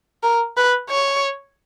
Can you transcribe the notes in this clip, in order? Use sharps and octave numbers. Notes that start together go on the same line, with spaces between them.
A#4
B4
C#5